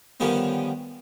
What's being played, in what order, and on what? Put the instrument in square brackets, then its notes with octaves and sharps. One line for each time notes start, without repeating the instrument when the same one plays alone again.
[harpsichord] D3 D#3 F3 G3 B3 C#4